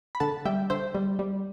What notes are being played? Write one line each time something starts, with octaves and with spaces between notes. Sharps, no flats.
B5
D3 F#5 A5
G3 E5 G5
D3 C5 E5
G3
G3